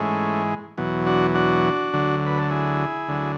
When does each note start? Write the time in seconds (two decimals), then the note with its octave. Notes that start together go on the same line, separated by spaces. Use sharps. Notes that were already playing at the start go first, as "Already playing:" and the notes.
Already playing: G#2 E3 G#3 A3 C#4
0.78 E2 B2 F#3
1.06 D4 F#4
1.35 D4 F#4
1.93 D2 D3 F#3
2.27 B4
2.38 A4
2.51 E4 G#4
3.08 D2 D3 F#3